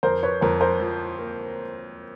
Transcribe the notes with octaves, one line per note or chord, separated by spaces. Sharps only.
F2 A#4 C5
B4 C#5
F2 A#4 C5
A#4 C5
F3
A#3